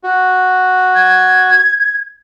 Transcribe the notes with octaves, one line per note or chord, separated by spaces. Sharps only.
F#4
G#6